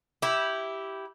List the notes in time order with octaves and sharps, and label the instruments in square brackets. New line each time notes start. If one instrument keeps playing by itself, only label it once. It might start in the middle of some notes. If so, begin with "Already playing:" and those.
[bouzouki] E4 G4